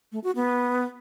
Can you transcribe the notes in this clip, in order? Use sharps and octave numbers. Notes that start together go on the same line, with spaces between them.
A3
F#4
B3